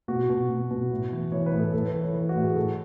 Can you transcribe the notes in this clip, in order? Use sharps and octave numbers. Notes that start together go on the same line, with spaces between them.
B2 F#4
B2
B2
B2
A2
E3
E3 C#5
B4
A2
A4
A2 A4
B4
E3
C#5
E3 B4
F#4
A2
G#4
A2 A4